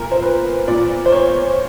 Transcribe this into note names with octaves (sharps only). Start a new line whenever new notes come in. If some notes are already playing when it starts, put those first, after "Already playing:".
Already playing: A#2 A#4
C5
B4
A#2 D5
C5
C#5